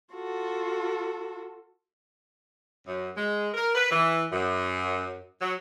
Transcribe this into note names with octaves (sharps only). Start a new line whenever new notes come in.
F4 F#4 A4
F#2
G#3
A#4
B4
E3
F#2
F#3